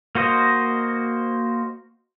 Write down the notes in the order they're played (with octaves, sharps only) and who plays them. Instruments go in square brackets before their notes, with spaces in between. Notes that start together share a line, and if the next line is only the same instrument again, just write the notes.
[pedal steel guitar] A#3 F#4 C5 D#5